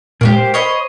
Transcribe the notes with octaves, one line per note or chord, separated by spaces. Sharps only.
A#2 G#3 A#3 F#4 G4
C5
C#5 D#5 B5